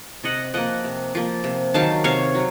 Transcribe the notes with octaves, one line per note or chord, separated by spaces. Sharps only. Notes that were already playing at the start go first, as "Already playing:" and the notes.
C3 D#5 F#5
F3 A#3 D#5 F#5
C3
F3 A#3
C3
D#3 F#3 F5 A5
C3 C#5 F5
F#3